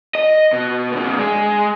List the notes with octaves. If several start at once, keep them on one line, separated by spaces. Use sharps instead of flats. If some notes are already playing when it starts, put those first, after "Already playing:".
D#5
B2
A#2 D3
G#3